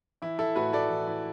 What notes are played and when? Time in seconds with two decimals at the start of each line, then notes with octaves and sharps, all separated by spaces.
0.22 E3 E4
0.39 E3 E4 A4
0.55 A2 F#4 B4
0.73 A2 A4 D5
0.90 E3
1.07 E3